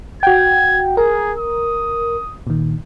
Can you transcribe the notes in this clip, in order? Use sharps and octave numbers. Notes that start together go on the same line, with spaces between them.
F#4 F#5 G5 G#6
G#4 A#4
D#6
A#2 D#3